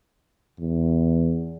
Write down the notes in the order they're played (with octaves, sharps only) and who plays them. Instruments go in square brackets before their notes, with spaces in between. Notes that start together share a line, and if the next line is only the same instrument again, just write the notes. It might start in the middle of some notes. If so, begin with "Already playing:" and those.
[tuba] E2